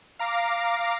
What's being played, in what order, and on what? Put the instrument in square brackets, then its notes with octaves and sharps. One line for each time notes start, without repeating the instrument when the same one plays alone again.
[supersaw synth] F5 A#5 D6